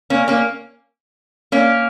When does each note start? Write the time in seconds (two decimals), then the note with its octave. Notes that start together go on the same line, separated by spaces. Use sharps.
0.10 A#3 C#4
0.28 A#3 C#4
1.52 A#3 C#4